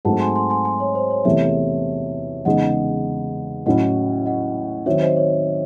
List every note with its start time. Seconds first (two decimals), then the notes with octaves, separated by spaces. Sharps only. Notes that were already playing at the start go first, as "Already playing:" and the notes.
0.05 G#2 F#3 A3 C4 F#4 F#5 A5
0.20 G#5 C6
0.35 G#5 C6
0.50 G#5 C6
0.65 G#5 C6
0.80 C#5
0.95 C5
1.11 C#5
1.25 E2 C3 E3 A3 C#5 E5
2.45 E2 C#3 G#3 D#4 D#5 F#5
3.66 A2 F#3 C#4 E4 D#5 F#5
4.26 D#5 F#5
4.86 D#3 F#3 C4 C#5 E5
5.02 C5 D#5
5.17 C#5